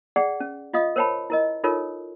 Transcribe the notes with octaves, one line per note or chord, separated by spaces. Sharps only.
G#4 D5 F#5 G5
C#4
F4 D#5 F5 D#6
A#4 C5 C#5 G5 A5 B5
E4 A#4 D#5
D#4 F4 A4 A#4 C#5